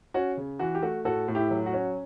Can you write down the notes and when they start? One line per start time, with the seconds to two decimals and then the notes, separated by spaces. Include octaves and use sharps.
0.14 C#4 F#4
0.37 C#3
0.59 E3 F#4
0.75 G4
0.82 A3 F#4
1.05 A2 F#4 A4
1.28 A2
1.35 E4 G4
1.51 F#3
1.66 F#4
1.73 C#4